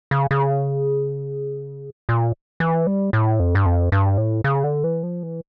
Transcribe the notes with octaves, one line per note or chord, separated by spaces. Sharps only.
C#3
C#3
A#2
E3
G3
A2
F2
G2
F2
G2
A2
C#3
D3
E3
F3
E3